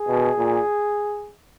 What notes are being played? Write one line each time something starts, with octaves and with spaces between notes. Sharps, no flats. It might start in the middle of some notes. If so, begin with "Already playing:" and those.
Already playing: G#4
B2
A#2